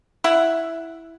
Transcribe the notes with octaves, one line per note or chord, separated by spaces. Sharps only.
E4 E5 F#5